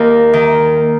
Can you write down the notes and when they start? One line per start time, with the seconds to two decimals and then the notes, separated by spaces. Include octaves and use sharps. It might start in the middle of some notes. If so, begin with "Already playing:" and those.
Already playing: D#2 A#4
0.33 D#3